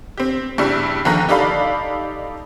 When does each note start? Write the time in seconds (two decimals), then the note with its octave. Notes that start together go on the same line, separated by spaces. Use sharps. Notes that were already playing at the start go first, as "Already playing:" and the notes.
0.17 C4 G4
0.58 G2 C#3 G3 E4
1.05 D#2 D3 F3 A#5 F#6 A#6
1.28 D#4 G4 A4 D5 F5 B5